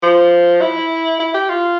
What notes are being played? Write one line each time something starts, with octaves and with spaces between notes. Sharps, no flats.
F3
E4
E4
G4
F4